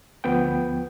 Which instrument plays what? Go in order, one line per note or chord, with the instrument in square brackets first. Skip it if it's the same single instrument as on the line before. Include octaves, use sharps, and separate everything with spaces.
[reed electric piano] D2 F3 B3 G5